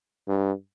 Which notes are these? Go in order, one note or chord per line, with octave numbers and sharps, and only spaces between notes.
G2